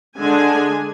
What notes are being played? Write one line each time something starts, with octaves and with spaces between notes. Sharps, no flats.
D3 G#3 D4 G#5